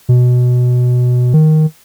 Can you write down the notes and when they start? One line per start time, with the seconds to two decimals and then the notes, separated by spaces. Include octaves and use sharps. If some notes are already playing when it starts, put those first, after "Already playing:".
0.09 B2
1.33 D#3